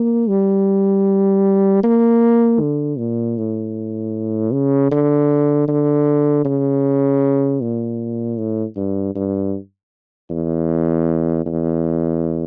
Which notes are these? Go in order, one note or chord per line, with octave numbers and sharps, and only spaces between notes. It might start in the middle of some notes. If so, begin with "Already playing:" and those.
Already playing: A#3
G3
A#3
D3
A#2
A2
C#3
D3
D3
C#3
A#2
A2
G2
G2
E2
E2